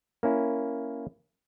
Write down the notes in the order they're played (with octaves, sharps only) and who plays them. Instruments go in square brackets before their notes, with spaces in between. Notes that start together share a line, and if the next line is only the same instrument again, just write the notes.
[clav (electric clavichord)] A#3 C#4 E4